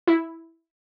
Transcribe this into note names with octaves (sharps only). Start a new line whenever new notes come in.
E4